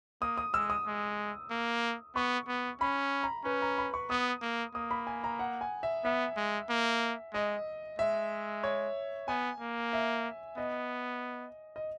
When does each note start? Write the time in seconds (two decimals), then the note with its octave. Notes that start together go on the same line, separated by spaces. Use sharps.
0.22 A#3 D#6
0.37 D#6
0.53 G#3 E6
0.70 D#6
0.87 G#3
1.51 A#3
2.16 B3 C#6
2.48 B3
2.81 C#4 B5
3.24 A#5
3.45 C#4 B4
3.62 A#5
3.78 B5
3.94 C#6
4.10 B3 D#6
4.42 A#3
4.75 A#3 D#6
4.91 B5
5.07 G#5
5.24 A#5
5.39 F#5
5.61 G#5
5.83 E5
6.04 B3 E5
6.37 G#3
6.70 A#3
7.34 G#3 D#5
7.99 G#3 E5
8.63 C#5
9.28 B3 G#5
9.60 A#3
9.93 E5
10.58 B3 D#5
11.76 D#5